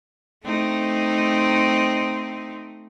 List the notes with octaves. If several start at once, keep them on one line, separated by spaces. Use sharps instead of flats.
A3 C4 D#4